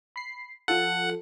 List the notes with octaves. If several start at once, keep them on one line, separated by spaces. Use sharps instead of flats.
B5 C7
F3 F4 A4 F#5